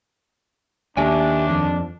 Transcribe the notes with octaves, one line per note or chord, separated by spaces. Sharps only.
D#2 D4 G4 E5 G#5
F2